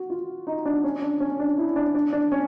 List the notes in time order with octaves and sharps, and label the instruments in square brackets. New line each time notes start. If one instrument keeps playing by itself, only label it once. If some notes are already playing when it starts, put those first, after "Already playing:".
Already playing: [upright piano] F#4
F4
D#4
D4
C#4
D4
C#4
D4
E4
D4
D4
D4
C#4